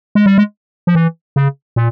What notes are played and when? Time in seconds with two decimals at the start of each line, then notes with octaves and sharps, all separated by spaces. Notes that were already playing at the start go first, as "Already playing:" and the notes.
0.15 G#3
0.26 G3
0.38 G#3
0.87 F3
0.95 E3
1.36 C#3
1.76 A#2